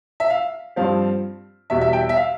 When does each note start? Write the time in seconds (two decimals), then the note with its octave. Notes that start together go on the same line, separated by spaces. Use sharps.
0.20 E5
0.30 F5
0.76 G2 F3 C4 F5
1.70 E2 B2 G3 E5
1.81 E5
1.93 E5 G5
2.09 E5
2.16 F5